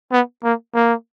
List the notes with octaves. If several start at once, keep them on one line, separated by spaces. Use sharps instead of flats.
B3
A#3
A#3